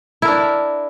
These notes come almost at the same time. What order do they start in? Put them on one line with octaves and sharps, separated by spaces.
E4 A#4 D4